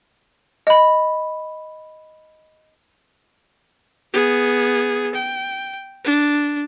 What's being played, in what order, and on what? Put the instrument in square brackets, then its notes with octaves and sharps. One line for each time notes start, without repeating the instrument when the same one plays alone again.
[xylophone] D#5 B5
[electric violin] B3 G#4
G5
D4